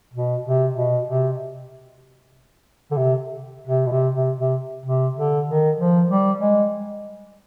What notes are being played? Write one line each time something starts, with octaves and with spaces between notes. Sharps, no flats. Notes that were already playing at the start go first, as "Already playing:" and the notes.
B2
C3
B2
C3
D3
C3
C3
B2
C3
C3
C3
C3
D3
D#3
F3
G3
G#3